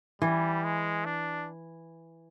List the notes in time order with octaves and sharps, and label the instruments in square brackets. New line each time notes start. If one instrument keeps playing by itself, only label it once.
[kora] E3 [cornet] G3
[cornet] G#3
D4